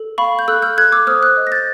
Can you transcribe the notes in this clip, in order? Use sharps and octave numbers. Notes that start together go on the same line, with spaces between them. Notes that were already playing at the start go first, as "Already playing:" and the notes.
Already playing: A4
F5 B5 C#6
G6
A4 E6 F#6
F6 G6
A4 F#6 G#6
D6 E6
C5 D#6 F6
E6 F#6
D#5
A#6
G6 A6